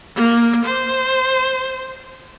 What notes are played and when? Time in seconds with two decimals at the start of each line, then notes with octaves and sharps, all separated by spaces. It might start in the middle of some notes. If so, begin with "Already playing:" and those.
0.15 A#3
0.65 C5